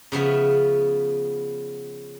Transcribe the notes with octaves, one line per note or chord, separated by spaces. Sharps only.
C#3 F3 B3 E5